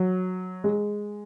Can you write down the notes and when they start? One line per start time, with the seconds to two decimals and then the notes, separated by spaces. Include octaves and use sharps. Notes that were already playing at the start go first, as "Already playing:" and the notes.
Already playing: F#3
0.64 G#3